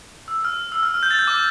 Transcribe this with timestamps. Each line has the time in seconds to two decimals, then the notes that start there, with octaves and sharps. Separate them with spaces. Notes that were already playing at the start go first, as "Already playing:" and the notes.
0.28 E6
0.45 F6
0.72 E6
0.83 F6
0.94 F6
1.03 G6
1.11 A6
1.19 G6
1.27 D6